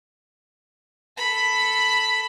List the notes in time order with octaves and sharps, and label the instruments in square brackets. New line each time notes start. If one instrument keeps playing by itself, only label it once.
[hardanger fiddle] A4 B5